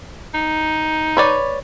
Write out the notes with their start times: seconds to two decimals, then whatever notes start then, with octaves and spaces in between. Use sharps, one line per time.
0.34 D#4
1.17 B4 C#5 D5